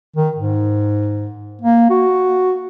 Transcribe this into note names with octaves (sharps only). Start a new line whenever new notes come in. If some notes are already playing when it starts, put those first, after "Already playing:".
D#3
G#2
A#3
F#4